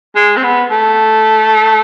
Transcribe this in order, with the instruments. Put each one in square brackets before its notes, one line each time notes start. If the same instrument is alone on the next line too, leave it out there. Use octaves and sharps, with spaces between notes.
[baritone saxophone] G#3
C4
B3
A3